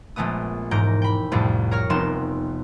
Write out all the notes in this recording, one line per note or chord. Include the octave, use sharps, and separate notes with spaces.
A#1 G#3 A3 B3 D#6
E1 G#2 A#4 A#5 G6 D7
G5 B5
C2 F2 A2 C3 A3
A#4 C#5 A#5 F6
F1 B3 C4 D#4 C6 E7